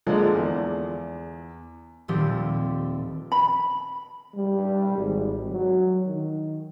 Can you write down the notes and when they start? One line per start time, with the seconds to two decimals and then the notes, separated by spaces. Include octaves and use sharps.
0.07 D3 F3 G#3 A#3
0.34 E2
2.08 D#1 D#3 F3 A3 C4 G4
3.32 B5
4.35 G3
4.98 G#1
5.51 F#3
6.06 D#3